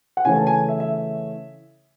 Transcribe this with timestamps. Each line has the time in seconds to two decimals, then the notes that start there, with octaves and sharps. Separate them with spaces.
0.17 F#5
0.25 C#3 E3 A3 C#4 G#5
0.36 A5
0.47 G#5
0.68 E5
0.80 E5